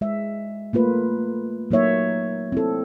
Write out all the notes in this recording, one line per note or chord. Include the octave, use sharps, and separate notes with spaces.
G#3 E5
A3 A#3 F4 B4
F#3 A#3 D#4 C#5 E5
C4 E4 A4